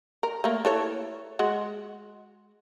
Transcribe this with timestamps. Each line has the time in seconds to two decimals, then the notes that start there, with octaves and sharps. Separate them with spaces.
0.23 A#4
0.44 A3 A#3
0.65 E3 A4 C#5
1.39 G#3 F#4 F#5